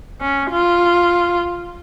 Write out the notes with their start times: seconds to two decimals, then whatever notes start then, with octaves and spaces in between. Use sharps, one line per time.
0.21 C#4
0.52 F4